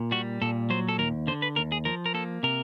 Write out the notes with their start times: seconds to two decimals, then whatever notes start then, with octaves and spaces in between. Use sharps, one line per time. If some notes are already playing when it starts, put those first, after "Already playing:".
Already playing: A#2
0.11 G3 F#4
0.42 A#2 A4
0.70 F#3 C5
0.89 A4
0.98 D#2 A#4
1.27 D3 C5
1.42 B4
1.56 D#2 A#4
1.72 G#4
1.85 F3 A#4
2.06 A#4
2.14 A#3 A4
2.43 C3 A#4